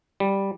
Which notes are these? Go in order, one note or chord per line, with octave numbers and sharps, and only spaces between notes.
G3